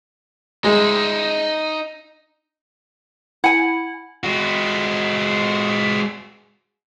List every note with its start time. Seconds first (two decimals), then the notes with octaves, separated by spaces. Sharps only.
0.64 G#3 D#4 E5
3.44 E4 F#5 G#5
4.23 G#3 F#4